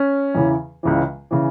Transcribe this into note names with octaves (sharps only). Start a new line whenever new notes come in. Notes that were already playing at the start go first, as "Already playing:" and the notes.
Already playing: C#4
E2 C#3 E3
C#2 C#3 E3
C#3 E3